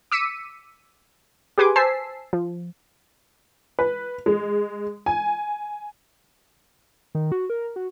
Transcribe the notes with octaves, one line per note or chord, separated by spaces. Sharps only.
D6 E6 B6 C#7 D#7
G4 G#4 B4 G#5 C6 D6
C5 G#5 A5 E6 B6 C7
F3
B4
G#3
G#5
D#3
F#4
A#4
F#4